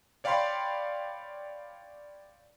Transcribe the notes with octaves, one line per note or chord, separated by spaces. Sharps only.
C#5 D5 F5 G5 B5 C6